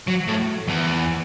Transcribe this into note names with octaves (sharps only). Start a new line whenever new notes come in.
F#3
A2
E2